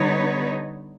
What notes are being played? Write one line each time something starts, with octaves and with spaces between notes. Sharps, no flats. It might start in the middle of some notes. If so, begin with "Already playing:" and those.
Already playing: D3 G3 B3 D#4 B4 C#5